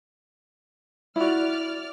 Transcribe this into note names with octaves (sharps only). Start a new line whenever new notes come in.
E4 F#4 D5 F6